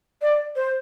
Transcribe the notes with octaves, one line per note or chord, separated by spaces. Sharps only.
D5
C5